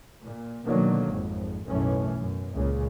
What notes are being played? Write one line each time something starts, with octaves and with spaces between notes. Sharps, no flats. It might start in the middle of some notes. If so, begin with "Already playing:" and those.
A#2
B2 D3 D#3 F#3 A#3
G#1 F2
B1 F#2 A2 E3 A3 C#4
F#2
C#2 A#2 C#3